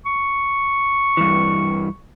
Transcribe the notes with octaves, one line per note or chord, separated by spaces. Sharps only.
C#6
G2 E3